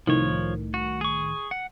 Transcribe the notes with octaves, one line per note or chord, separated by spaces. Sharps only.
C2 A2 D#3 F3 C#5
F#4
G#4 C#6
F#5